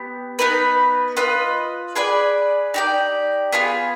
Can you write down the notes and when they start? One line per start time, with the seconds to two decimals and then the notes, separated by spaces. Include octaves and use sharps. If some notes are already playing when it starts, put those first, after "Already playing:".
Already playing: B3 G4
0.39 B3 D#4 B4
1.17 F4 B4 D#5
1.96 G#4 B4 D5 G#5
2.74 D#4 G4 D5
3.52 B3 F4 G#4